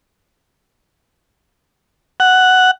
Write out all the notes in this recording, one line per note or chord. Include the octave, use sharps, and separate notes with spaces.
F#5